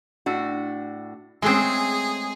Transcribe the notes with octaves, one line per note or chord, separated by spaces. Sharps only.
A2 D4 F#4
G#3 A3 C4 C#4 G#4